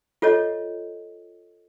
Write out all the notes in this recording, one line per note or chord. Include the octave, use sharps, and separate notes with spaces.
F4 A4 C#5 D#5